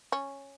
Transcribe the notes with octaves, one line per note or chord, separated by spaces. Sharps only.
C#4